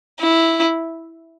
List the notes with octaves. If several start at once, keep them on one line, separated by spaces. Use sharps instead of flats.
E4